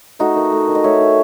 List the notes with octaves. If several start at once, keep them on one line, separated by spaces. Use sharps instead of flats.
A3 D#4 F#4
D#3
A3
D#3
D#5
A3 C#5 E5
D#3